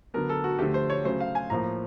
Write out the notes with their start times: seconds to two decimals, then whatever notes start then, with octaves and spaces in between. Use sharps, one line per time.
0.14 D3 F#3 B3 A#4
0.29 A4
0.44 F#4
0.59 D3 F3 A3 G4
0.74 C5
0.90 C#5
1.04 C#3 F#3 A3 C5
1.20 F5
1.35 G#5
1.50 A2 F3 A#3 A#5